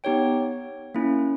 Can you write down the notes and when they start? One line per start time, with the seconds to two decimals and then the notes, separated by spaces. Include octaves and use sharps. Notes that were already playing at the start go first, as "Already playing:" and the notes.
0.04 B3 D#4 G4 C#5 G5
0.95 A#3 C#4 E4